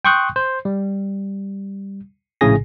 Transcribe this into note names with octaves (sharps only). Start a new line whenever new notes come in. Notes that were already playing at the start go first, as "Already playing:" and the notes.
G5 C6 C#6 D#6 F#6 G6
C5
G3
A#1 A2 C#3 G#4 G#5 A#6